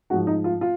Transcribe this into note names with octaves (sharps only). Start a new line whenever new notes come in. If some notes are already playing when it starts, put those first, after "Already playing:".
G#2 F3 F#4
D#4
F4
F4